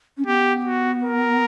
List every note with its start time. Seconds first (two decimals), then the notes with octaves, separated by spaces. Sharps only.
0.17 C#4
0.26 B3 G4
0.65 F#4
1.03 A#4